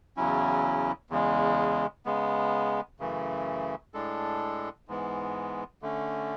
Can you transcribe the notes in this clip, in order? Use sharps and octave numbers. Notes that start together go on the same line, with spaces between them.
E2 C#3 F#3 C#4 E4
E2 C#3 G#3
C#3 G#3 B3
F#2 C#3 E3 A3
A2 G#3 D4 A4
G#2 E3 G#3 B3
D3 A3 C#4